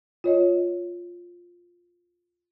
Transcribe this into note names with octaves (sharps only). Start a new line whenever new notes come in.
F4 C#5 D#5